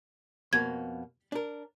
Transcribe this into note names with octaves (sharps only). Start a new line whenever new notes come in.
F2 B2 A#3 G#6
D4 A#4